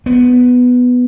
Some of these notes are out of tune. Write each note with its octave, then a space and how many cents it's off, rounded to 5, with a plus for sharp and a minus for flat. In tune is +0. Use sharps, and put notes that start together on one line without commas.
B3 +5